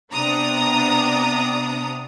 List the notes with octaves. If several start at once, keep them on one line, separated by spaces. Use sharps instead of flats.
C3 B3 D4 A#5 D#6